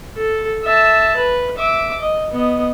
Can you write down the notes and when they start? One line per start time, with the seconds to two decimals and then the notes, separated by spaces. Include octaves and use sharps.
0.17 A4
0.64 E5 A5
1.16 B4
1.58 E5 D6
2.01 D#5
2.31 B3 D#5